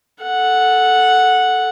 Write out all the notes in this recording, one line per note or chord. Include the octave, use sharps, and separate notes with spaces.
A4 F#5